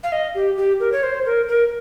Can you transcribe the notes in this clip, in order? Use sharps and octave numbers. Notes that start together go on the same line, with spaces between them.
F5
D#5
G4
G4
A#4
C#5
C5
A#4
A#4